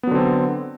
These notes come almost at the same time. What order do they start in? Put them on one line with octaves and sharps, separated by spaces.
B3 F#3 D3 C4